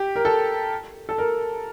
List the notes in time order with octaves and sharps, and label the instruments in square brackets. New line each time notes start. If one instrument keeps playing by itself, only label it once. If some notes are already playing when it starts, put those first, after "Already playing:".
Already playing: [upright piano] G4
A#4
A4
A4
A#4